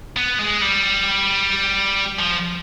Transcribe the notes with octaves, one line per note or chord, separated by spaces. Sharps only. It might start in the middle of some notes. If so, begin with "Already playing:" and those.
B3
G#3
G3
F3